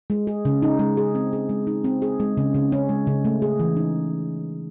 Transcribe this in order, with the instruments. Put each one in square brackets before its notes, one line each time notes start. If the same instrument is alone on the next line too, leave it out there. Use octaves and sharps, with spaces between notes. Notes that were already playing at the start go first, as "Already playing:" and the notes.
[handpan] G#3
G#4
C#3
D#4
G#3
G#4
C4
G#4
G#3
D#4
C4
G#4
G#3
C#3
C#3
C#4
G#3
C#3
A3
G#4
E3
D#4